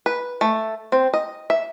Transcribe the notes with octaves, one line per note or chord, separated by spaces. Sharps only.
B4
A3
C4
D#5
E5